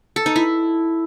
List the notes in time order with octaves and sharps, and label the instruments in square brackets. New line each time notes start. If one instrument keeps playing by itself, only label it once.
[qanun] A4
D#4
E4